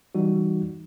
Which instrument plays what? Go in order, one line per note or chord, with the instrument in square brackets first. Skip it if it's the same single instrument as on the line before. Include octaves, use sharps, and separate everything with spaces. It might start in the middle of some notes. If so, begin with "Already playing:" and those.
[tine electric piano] E3 G3 D#4 F#4